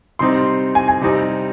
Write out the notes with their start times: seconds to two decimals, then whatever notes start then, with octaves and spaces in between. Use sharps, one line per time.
0.19 C3 G3 C4 D#4 C6
0.75 G#5
0.88 G#5
1.01 C3 G3 C4 D#4